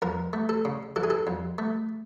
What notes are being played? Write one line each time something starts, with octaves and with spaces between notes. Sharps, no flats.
F2 A#4
A3
A4
C#3
E3 A4
G#4
A4
F2
A3